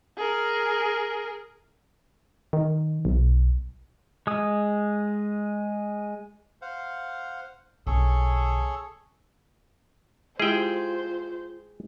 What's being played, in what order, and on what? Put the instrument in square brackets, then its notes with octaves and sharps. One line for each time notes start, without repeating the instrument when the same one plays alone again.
[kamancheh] G#4 A#4
[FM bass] D#3
B1
[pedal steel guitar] G#3 D#6
[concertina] C5 F5 F#5
[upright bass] B1 D3 [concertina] G#4 A4 C#5
[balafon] G#3 E4 G4 [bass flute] F4 [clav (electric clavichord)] G#4 G5 [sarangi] C5